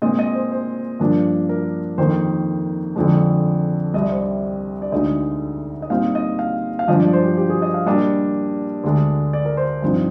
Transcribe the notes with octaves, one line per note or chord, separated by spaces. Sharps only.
A#2 G#3 C4 D#5
D#5
C5
C5
G2 F3 A#3 D4
A#4
F2 D#3 A#3 D#4 C5
F2 D3 F3 G#3 D4
C2 C3 G3 D#5
D5
C5
D5
D5
D2 D3 G#3 D#4 D#5
D#5
A#2 G3 C4 D#4 F5
D#5
F5
F5
G2 F3 G#3 D4 D#5
D5
C5
G4
G4
G#4
D#5
F5
A#2 G3 A#3 D4 D#5
D2 D3 G#3 D4
D5
A#4
C5
G2 F3 C4 D#4